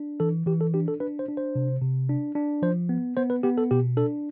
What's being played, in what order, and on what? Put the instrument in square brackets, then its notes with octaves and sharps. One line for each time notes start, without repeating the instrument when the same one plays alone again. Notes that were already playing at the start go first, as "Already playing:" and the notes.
Already playing: [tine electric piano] D4
E3 A4
E3 G4
A4
D4 G4
A4
D4 B4
C5
D4
C5
C3
C3
D4
D4
F3 C5
B3
B3 C5
B4
B3 G4
A4
B2 G4
D4 A4